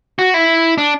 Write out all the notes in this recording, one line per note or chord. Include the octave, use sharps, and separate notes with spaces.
F#4
E4
D4